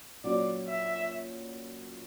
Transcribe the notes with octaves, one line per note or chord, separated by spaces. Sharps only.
A#2 F#3 C#4 F#4 D5
E5